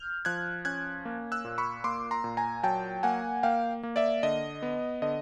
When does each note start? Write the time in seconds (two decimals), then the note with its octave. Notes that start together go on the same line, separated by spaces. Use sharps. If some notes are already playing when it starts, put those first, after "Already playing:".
Already playing: F6 G6
0.25 F3 F#6 G#6
0.65 C#4 F#6 G#6
1.05 A#3
1.32 E6 F#6
1.45 A#2
1.58 B5 C#6
1.84 A#3 C6 D6
2.11 A#5 C6
2.24 A#2
2.37 G#5 A#5
2.63 F#3 G5 A5
3.03 A#3 F#5 G#5
3.43 A#3 F5 G5
3.83 A#3
3.96 D5 E5
4.23 D3 D#5
4.62 B3
5.02 D3 D#5